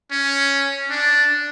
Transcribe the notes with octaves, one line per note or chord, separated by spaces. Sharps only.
C#4
D4